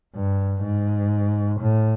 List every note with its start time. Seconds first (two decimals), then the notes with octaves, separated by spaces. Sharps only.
0.15 G2
0.63 G#2
1.60 A2